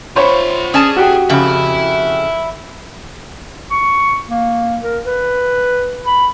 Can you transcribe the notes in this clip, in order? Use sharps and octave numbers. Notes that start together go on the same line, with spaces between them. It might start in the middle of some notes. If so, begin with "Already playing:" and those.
F4 C5 C#5 F#5 B5
C#4 G#4 D5 A5
F#4 G4 G5
F2 C#3 E5 B5
C#6
A#3
A#4
B4
B5